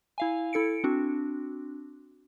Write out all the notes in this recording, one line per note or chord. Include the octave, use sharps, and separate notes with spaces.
E4 F5 G#5
E4 A4 C#7 D7
C4 D4 F#4